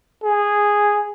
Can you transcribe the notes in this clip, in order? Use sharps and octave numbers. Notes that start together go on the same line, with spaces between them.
G#4